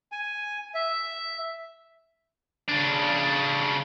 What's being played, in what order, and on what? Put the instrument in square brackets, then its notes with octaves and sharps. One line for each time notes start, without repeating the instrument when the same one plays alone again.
[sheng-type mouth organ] G#5
E5
[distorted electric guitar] C#3 D4